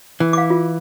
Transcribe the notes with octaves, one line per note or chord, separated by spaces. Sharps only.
E3
F5 D6
F4